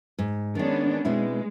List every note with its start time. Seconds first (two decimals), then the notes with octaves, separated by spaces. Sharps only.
0.19 G#2
0.55 D#3 G#3 B3 C#4 D4
1.05 B2 G#3 C4 E4